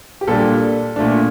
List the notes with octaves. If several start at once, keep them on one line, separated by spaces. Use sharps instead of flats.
G4
A#2 G3 D4 A4
A#2 A3 D4